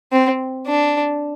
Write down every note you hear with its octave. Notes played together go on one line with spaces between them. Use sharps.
C4
D4